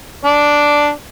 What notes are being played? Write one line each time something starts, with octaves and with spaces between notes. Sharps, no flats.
D4 D5